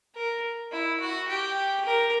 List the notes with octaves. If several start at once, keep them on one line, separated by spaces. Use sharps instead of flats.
A#4
E4
F#4
G4
A#4